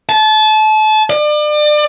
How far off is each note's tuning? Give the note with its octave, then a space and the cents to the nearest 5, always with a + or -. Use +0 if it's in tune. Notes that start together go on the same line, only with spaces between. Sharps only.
A5 -30
D5 +35